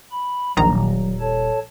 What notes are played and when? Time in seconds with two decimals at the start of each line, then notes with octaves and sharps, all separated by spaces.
0.12 B5
0.57 D#1 A#1 D#3 F#3 A#5
1.20 A4 C#5 A5